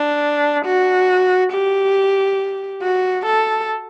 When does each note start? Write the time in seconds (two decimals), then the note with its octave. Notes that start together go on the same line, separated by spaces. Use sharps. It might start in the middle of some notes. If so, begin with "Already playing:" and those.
Already playing: D4
0.66 F#4
1.52 G4
2.82 F#4
3.26 A4